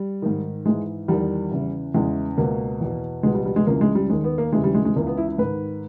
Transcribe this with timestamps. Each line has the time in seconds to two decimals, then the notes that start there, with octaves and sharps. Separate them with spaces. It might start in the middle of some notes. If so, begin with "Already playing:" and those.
Already playing: G3
0.22 G#2 D#3
0.65 G#2 E3 G#3
1.08 E2 D#3 G3
1.52 E2 C#3 E3
1.94 E2 C#3 E3 G#3
2.38 C#2 B2 A#3
2.81 E2 B2
3.23 C#2 B2 G#3
3.35 G3
3.46 G3
3.56 G#3
3.67 C#2 C#3 E3 A#3
3.81 G#3
3.95 G3
4.10 D#2 D#3 G#3
4.24 B3
4.38 A#3
4.53 D#2 C#3 E3 G#3
4.64 G3
4.74 G#3
4.85 G#3
4.96 C#2 C#3 E3 A#3
5.07 B3
5.17 E4
5.28 E4
5.38 G#2 D#3 B4